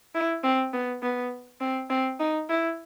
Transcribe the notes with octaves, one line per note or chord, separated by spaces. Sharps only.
E4
C4
B3
B3
C4
C4
D#4
E4